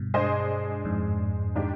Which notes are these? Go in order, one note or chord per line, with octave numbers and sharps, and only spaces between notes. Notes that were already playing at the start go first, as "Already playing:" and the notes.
Already playing: G2 B2
G#3 D4 G#4 C5 D#5
F2 G#2
D#3 G#3 D4 G4